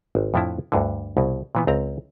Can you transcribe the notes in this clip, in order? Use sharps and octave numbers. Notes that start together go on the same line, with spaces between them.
G#1
F2 A2 F3 D4 E4
D2 G2 D3
C2 B2
A#2 E3 B3
C#2 C4 A#5